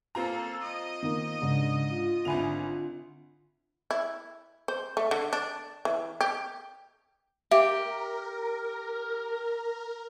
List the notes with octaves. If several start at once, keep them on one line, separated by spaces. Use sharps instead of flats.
A#3 C4 F4 A4 A#5
D#5 D#6
D#3 A#3
G#2 C#3 D4
F4
G#1 D3 E5 G#5 B5 F7
E4
C5
A3
D3
D4
E3
G4
G4 A#4 E5